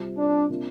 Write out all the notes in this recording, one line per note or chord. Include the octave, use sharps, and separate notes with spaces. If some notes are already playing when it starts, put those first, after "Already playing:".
Already playing: C3 G3 C4 F4
D4
C3 A#3 D4 F4